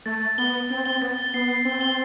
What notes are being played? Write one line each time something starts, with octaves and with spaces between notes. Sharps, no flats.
A3 A6
A6
B3 G7
G7
C4 G7
C4 G7
B3 A6
A6
B3 C7
C7
C4 G7
G7